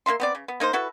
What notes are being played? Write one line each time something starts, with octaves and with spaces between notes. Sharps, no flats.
A#3 F#4 E5 C6
B3 C4 D5
C#3
B3
A#3 D#4 A#4 C5
E4 F#4 A4 B4